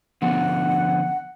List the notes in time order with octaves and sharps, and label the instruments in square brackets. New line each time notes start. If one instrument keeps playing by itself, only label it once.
[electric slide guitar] D3 F3 B3 [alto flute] F#5